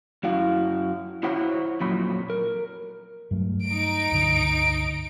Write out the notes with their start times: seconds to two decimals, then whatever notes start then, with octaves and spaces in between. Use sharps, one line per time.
0.23 F#2 E4 F#4 F5
1.23 E4 F#4 C5 C#5 F#5 B5
1.81 F2 A#2 F#3 B5
2.30 A#4
3.31 G2 F#3 A3
3.65 D#4 D7
4.12 C#2 G2 D3